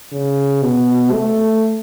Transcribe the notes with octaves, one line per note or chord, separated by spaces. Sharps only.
C#3
B2
A3